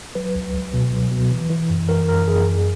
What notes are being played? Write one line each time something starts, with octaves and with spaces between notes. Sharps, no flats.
F#3 B4
C#2
C#2
B2
F#3
B2
E3
E3
F#2
E3 A#4
F#2 A#4
F#2 G#4
F#2